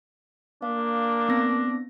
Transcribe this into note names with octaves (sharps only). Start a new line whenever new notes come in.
A#3 D4 F5
B3 C4 A#6